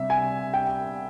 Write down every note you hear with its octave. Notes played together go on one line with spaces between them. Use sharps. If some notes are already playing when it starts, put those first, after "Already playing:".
Already playing: C3 G3 E5
G#5
G5